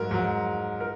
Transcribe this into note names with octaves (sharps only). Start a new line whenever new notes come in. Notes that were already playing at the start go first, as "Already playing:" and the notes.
Already playing: G#2 F#3 A#4
G#2 F#3
A#4